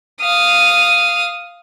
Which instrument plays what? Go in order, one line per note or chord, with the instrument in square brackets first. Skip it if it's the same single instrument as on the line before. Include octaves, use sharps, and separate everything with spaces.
[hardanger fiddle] F5 D#6